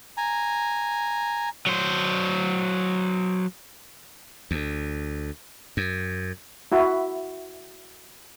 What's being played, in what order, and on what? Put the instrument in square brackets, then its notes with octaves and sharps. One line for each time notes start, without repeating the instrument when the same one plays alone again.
[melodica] G#5 A#5
[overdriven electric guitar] F#3 C5
[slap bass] D2
F#2
[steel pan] E4 F#4 E5